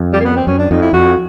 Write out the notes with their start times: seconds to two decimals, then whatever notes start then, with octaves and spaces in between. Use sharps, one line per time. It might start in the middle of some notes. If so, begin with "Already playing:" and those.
Already playing: F2
0.13 G3
0.20 A#3
0.24 B3
0.36 C4
0.47 F#2 C#4
0.58 D4
0.71 F2 D#4
0.82 E4
0.93 F2 F#4